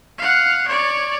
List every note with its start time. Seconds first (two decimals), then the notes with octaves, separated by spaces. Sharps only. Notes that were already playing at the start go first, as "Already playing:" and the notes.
0.18 F5 F#5
0.67 C#5 D5